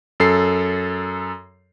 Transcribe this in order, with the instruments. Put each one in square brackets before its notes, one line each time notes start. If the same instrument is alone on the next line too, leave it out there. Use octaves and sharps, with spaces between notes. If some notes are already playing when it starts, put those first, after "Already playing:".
[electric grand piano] F#2 A4 C7